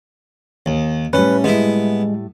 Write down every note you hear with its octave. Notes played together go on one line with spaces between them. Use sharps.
D#2
A2 G3 C#4 B4
G#3 B3 E4